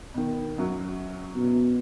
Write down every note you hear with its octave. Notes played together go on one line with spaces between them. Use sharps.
B2 D#3
F#2 F#3
B2